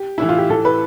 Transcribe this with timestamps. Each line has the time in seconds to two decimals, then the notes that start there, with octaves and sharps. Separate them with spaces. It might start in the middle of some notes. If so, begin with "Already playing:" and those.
Already playing: G4
0.18 A2 E3 E4
0.29 F4
0.38 G4
0.50 A2 E3 A4
0.65 B4